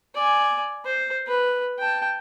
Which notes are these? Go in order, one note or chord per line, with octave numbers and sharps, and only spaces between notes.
D5 G#5
C5
B4
G5 A5